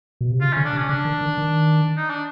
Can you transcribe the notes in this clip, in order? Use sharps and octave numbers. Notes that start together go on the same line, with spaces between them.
B2
C3
C#3 F4
D3 C#4
D4
C3
C#4
C#3 D4
D#3
D#3
D#3
D#4
D4